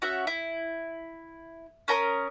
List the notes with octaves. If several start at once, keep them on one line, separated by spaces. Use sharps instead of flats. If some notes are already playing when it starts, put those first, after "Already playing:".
C#4 F#4 E5
E4
C#4 A#4 A#5 D#6